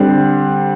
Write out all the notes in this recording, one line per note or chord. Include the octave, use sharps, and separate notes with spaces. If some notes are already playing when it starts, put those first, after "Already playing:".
Already playing: D3 G3 C4